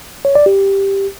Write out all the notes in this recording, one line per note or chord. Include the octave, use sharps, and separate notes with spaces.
C#5
D5
G4